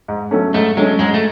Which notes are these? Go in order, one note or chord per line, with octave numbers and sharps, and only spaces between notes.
G#2
F#3 A3 C#4
G#2 A3
F#3 G#3 A3 C#4
G#2 G#3
A3